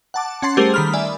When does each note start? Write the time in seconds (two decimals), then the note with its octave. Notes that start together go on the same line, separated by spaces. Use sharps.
0.14 F#5 A5 D6
0.42 C#4 F#5 A5 C6 A6 C7
0.57 G3 A3 G4 G#4 A#4 C5
0.74 D#3 B5 F6
0.93 D5 E5 G#5